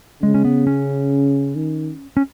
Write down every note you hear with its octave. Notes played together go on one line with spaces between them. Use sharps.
C#3 G#3
C#4
B3
C#4
D#3
C#4